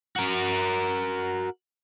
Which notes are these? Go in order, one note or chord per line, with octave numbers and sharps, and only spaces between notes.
F#4 A#4